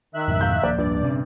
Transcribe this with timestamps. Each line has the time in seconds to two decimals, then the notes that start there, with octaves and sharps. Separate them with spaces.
0.15 D#3 E5 F#6
0.28 F2 G#2 B2
0.41 F5 G6
0.63 D1 F3 A#3 D5
0.78 G2 D5
1.03 C3 C4 C#4